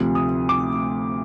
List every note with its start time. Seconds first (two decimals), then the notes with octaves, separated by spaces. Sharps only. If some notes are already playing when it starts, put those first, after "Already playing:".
Already playing: D2 C3 F3
0.15 D#6
0.49 D6